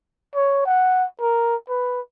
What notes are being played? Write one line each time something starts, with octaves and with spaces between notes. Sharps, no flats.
C#5
F#5
A#4
B4